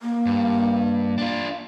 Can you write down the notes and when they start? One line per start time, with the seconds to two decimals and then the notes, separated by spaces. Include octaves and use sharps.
0.01 A#3
0.26 G2
1.18 D4 F4